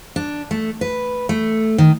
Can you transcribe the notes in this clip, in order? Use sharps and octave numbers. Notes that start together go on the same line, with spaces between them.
D4
A3
B4
A3
D#3